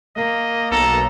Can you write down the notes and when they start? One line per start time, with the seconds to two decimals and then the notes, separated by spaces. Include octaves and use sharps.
0.16 A#3 D#5
0.71 B1 A4 A#5